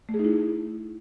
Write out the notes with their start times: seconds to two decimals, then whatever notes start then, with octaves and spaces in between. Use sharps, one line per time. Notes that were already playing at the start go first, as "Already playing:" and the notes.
0.09 A3
0.14 G#4
0.19 D#4
0.25 E4